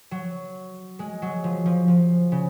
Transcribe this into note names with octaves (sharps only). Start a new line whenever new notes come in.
F#3
G#3
F#3
F3
F3
F3
C#3